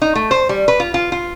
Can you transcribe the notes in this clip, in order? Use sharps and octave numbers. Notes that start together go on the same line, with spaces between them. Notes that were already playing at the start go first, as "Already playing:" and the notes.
D#4
A3
C5
G3
B4
F4
F4
F4